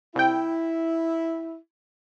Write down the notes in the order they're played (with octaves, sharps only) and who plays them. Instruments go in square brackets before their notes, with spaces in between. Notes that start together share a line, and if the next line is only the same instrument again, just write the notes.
[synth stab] C2 G5 [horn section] E4